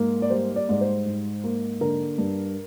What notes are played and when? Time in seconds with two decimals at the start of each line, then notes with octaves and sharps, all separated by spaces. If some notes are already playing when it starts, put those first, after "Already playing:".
Already playing: G#2 A#3
0.22 D5
0.30 G3 C5
0.56 D5
0.69 G#2 D5
0.81 C5
1.06 G#2
1.44 A#3
1.81 D3 A#4
2.18 G2